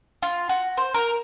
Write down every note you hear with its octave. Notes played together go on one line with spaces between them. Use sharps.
F4
F#4
C5
A#4